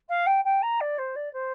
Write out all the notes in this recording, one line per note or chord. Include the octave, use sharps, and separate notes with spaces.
F5
G5
G5
A#5
D5
C5
D5
C5